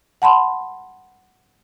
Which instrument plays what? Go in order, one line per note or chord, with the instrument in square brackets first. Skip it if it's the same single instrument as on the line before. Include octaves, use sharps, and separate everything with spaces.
[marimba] F#5 A5 B5 C6